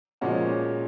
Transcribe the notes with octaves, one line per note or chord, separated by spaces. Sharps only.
A#2 F3 G#3 C#4 F#4